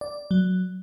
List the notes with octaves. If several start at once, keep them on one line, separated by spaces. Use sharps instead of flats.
D5
F#3